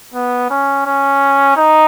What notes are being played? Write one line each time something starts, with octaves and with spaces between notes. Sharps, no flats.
B3
C#4
C#4
D#4